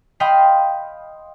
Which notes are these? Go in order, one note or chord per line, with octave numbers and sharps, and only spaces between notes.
D#5 F5 G5 B5 C6